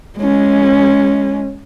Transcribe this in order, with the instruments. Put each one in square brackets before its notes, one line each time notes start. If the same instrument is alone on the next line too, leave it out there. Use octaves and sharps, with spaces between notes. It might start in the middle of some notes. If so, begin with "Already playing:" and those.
[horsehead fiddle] G#3 C#4